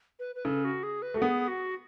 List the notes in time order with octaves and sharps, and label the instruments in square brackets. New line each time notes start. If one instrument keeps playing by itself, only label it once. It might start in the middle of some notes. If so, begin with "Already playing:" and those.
[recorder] B4
B4
[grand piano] C#3 [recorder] A4
[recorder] F#4
G#4
B4
[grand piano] A3 [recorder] F#4
[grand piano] B3 [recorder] G#4
[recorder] F#4